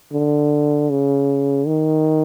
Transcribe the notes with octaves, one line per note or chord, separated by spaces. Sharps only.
D3
C#3
D#3